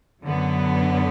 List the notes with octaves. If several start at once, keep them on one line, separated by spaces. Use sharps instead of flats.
F#2 D3 F#3 B3